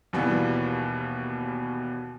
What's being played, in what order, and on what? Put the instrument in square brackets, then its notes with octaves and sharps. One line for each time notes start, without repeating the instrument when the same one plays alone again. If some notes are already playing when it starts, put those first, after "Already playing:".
[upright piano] D#2 B2 E3 G3 B3